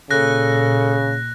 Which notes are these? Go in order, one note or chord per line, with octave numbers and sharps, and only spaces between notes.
A#2 C#3 A4 F#6 A#6